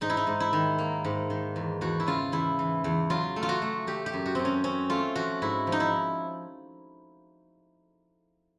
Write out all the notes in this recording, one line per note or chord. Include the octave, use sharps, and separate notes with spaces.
G#2 D#4
E4
D#4
G#2
E4
D#3
A#3
G#2
D#3
E2
E2 F#4
E4
C#3 F4
E2 E4
E3
E2
F#3 F4
A3
F4
F#4
A3
A3 G4
G4
F#2
F#4
F#2 C4
C#4
C4 C#4
A3 F4
F3 F#4
G#2 E4
F3
D#4
E4